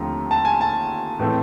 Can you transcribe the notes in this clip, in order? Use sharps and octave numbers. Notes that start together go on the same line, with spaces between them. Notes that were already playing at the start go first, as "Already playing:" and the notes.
Already playing: D#2 D3 F3 A3 C4 A#5
A5
G#5
A5
A2 E3 A3 C4